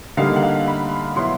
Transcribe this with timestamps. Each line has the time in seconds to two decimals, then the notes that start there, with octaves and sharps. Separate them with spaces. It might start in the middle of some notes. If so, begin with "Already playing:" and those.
0.17 D3 G3 A#3 D#4 F5
0.36 F#5
0.43 F5
0.68 B5
1.16 B2 F#3 B3 E4 C6